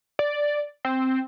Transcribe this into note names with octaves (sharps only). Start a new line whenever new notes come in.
D5
C4